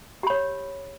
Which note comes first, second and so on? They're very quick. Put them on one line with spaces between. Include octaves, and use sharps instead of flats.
G4 B5 C#5